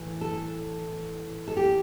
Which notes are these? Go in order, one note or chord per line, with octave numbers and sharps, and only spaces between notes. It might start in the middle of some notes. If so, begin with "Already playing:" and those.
Already playing: A2 E3
A4
A4
G4